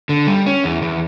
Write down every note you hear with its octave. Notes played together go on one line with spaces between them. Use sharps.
D3
G3
C#4
E2
E2